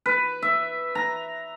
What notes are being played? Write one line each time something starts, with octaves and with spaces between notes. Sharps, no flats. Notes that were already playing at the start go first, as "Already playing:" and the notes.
B4
E5
A#5